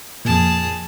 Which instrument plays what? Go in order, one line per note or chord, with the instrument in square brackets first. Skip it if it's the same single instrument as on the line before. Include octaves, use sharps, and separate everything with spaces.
[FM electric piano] F2 A#2 [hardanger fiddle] G#4 A5